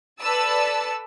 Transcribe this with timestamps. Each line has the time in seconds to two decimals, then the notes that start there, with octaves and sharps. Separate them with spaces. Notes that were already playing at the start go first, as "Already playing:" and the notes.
0.21 A4 B4 D5 A5 E6